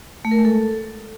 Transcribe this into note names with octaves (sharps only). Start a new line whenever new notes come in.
A3
A#4
G#3
A4